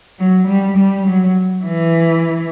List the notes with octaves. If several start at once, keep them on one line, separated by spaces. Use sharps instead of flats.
F#3
G3
G3
F#3
E3